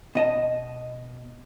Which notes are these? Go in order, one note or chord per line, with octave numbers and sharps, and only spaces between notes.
B2 D#5 A5